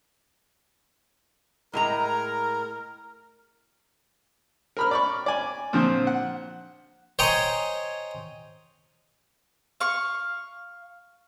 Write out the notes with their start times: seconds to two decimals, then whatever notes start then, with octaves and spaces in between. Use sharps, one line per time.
1.73 A2 G#3 A#4 A#5
4.77 A#4 B5 F6
4.91 D5 B5 C#6
5.26 D5 G#5
5.73 A#2 D3 F3 C4
6.07 F#5
7.19 C5 C#5 D#5 G5 G#5 A#5
9.80 F5 C#6